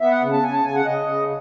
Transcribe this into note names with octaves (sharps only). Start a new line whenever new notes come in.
B3 E5
F#5
C#3
A5
C#3 G#5
A5
C#3 G#5
F#5
C#3 D#5
C#3